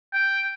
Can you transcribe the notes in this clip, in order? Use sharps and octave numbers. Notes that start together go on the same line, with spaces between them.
G5